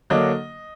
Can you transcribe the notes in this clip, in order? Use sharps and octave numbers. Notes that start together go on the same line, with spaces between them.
D3 F#3 A#3 D4 D#5